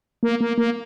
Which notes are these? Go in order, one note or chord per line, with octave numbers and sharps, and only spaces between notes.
A#3
A#3
A#3